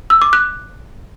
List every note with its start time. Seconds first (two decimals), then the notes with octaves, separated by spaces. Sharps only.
0.10 E6
0.22 D6
0.33 F#6